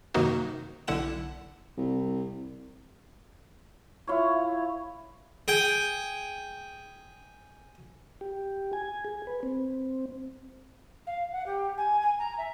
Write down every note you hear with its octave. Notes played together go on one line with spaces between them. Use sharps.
F#2 C3 D#3 A#3 D#4 F#4
B1 D3 E4 F#5 E7
C2
E4 F4 C#5
G#4 G5
G4
G#5
G#4
B4
C4
F5
F#5
G4
G#5
G#5
A#5
E5